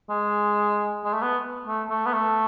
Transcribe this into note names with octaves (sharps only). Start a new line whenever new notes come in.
G#3
G#3
A3
B3
A3
A3
B3
A3